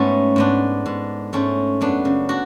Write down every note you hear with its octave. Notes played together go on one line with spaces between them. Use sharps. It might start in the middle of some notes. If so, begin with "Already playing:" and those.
Already playing: G#2 A3 B3 C#4
G#2 B3 D4
G#2
G#2 A3 C#4
F#2 B3 D4
C#3
D4 F#4